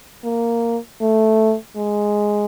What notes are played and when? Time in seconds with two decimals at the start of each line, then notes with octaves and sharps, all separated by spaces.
0.24 A#3
1.01 A3
1.77 G#3